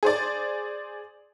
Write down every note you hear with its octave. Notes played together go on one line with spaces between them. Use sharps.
G#4 C5 D5